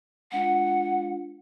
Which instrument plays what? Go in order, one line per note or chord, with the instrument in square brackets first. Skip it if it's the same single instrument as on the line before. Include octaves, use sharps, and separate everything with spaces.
[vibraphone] G#3 D4 F4 [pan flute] F#5